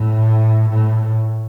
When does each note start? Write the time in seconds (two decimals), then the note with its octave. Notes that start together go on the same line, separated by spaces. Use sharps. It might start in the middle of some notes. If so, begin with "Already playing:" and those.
Already playing: A2
0.69 A2